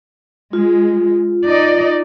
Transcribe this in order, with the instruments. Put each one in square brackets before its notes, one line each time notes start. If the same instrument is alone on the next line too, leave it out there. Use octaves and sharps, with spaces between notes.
[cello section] G#3 [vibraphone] F4
[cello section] D#4 D5 D#5